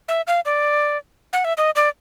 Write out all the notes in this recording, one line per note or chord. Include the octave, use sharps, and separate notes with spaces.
E5
F5
D5
F#5
E5
D#5
D5